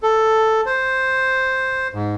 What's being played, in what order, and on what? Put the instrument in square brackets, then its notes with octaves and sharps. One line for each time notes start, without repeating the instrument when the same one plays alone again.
[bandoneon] A4
C5
G#2